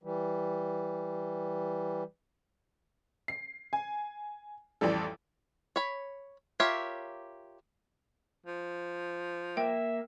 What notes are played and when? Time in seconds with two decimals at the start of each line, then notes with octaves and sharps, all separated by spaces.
0.03 E3 G3
3.28 C7
3.73 G#5
4.81 A1 F2 E3 G3 A4
5.76 C#5 B5
6.60 F4 G4 A#4 C#5 E5
8.46 F3
9.57 A#3 E5 G5